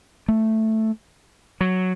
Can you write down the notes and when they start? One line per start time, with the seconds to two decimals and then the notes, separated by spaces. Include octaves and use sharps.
0.28 A3
1.61 F#3